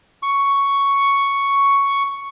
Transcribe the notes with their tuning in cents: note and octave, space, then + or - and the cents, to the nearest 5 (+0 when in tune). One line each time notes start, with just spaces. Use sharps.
C#6 +5